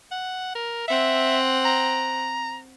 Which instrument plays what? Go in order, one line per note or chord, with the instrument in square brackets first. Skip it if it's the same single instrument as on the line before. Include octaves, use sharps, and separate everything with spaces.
[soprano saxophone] F#5
A#4
[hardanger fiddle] C4 F#5 [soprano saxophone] E5
[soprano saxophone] A#5